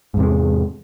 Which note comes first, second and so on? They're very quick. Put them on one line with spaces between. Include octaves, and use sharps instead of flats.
G#2 E2 C3 G#3